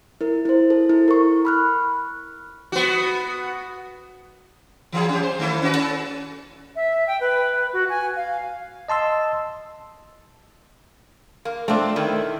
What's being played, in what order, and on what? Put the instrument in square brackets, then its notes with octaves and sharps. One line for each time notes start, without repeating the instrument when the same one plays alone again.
[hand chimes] E4 A#4
E4 C5
A4
E4
A#4 C#6
B5 F6 F#6
[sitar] B3 F#4
E3 F#3 G#4
C#4 G4
C5
D#3 A3 E4
C#4 F#4 B4
C#4 A4
[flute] E5
G5
B4
F#4
G#5
F5
[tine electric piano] D#5 A5 C6 E6
[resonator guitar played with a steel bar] A#3
[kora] A3 D4 [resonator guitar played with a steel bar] C4 F4
[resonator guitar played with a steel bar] D#3 [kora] E4